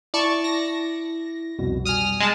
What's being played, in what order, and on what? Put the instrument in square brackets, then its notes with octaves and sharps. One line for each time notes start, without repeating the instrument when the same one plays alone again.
[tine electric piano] E4 [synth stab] D5 A5 C#6
[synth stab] A#6
[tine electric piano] C2 F2 B2
[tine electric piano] G3 G#5 [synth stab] D#6 F6
[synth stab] G#3 A5